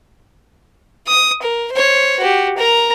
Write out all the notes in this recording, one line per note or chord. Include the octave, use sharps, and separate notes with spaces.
D#6
A#4
C5 C#5
F#4 G4
A#4 A#5